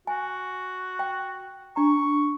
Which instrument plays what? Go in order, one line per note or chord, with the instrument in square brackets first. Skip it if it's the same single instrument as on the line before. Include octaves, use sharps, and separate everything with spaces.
[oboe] F#4 [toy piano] G#5
[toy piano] G5
[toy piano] D4 A#5 [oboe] C#6